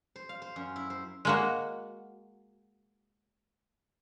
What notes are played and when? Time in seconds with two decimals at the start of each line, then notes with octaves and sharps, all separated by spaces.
0.16 C5
0.29 F5
0.42 C5
0.56 F#2
0.76 E4
0.90 C5
1.25 G#3 A#3 F#4